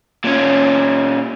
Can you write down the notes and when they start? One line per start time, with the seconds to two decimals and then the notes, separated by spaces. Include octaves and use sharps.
0.25 A#2 C#4